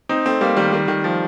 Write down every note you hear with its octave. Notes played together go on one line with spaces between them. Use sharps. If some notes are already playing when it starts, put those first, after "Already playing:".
C4 D#4
A3 C4
G3 A#3
D#3 G3
D#3 G3
D#3
F3